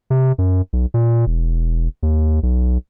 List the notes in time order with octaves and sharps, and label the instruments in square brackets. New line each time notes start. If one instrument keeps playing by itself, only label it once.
[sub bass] C3
F#2
B1
A#2
E1
D#2
B1